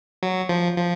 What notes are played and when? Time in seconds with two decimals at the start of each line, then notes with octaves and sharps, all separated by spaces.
0.23 F#3
0.49 F3
0.77 F3